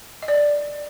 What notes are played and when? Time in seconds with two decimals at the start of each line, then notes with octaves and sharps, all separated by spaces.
0.22 D#5
0.28 D5
0.34 D#5